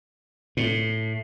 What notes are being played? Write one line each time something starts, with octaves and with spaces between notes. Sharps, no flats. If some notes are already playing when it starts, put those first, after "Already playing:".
A2